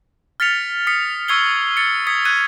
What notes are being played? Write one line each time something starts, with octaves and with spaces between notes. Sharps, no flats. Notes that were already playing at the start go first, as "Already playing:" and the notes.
F6 A6 B6 C#7 F7
D#6 B6 C#7
C#6 E6 G#6 C7 G7
A6 C#7
D#6 G#6 B6 C#7
F#6 G#6 D#7